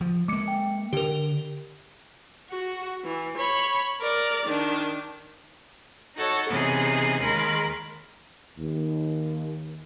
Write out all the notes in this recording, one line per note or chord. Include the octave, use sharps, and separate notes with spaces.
F3
G#3 A#3 D6 C#7
G5
D3 G4 A#4
F#4
E3
C#5 B5
A#4 D5
D#3 D4
D#4 F#4 A4 C#5
C3 E3 B3 C#4 D#4 G#4
D#2 D#3 G#3 A#4 B5 C6
D#2